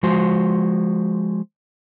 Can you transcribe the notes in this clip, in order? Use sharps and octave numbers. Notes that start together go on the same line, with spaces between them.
F3 G#3 F#4 C5